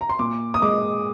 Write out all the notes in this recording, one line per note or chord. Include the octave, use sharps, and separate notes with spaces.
A#5
C6
A#2 D6
D#6
G#3 D6